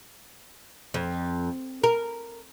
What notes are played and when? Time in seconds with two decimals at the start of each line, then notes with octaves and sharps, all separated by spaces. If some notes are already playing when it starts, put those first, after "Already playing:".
0.94 F2
1.84 A#4